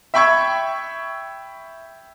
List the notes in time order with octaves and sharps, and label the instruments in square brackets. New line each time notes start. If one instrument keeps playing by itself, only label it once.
[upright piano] E5 G5 B5 C#6 E6 G#6